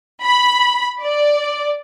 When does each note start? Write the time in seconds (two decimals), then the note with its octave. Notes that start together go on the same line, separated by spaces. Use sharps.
0.22 B5
1.01 D5